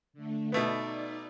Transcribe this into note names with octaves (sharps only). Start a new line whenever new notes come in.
D3 A3
B2 A3 B3 D#4 D5